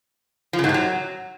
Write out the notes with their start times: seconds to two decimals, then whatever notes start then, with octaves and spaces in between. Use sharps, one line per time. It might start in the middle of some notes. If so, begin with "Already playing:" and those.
0.53 F3
0.59 C#3
0.64 G#2
0.69 C3
0.74 F#3